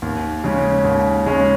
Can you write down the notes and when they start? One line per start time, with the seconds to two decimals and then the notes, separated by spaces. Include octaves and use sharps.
0.02 D#2
0.44 C#3 G#3 C#4
0.85 D#2
1.26 C#3 G#3 C#4